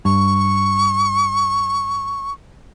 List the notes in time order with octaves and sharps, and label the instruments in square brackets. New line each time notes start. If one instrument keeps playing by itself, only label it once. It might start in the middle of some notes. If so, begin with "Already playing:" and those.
[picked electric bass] G2 [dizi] C#6